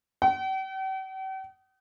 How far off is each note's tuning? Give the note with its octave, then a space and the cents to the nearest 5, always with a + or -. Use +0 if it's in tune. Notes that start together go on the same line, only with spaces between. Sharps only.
G5 -45